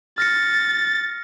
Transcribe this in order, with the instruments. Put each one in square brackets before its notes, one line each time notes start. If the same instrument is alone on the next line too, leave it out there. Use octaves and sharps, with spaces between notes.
[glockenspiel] F6 A#6 C#7 [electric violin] A6